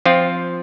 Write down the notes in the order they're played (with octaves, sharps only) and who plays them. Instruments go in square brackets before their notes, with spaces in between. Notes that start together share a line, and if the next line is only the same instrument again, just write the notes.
[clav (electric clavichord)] F3 C4 F4